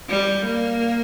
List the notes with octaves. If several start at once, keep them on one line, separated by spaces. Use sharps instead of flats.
G3
A#3